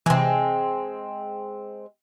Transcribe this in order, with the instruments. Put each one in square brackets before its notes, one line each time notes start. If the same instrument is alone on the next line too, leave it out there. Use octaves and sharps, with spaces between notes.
[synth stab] C3 E3 [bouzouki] G#3 C4